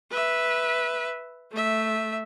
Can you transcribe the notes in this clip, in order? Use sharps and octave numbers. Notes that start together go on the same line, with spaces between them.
B4 E5
A3 E5